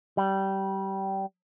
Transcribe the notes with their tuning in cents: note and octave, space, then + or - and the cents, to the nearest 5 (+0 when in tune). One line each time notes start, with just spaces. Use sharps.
G3 -20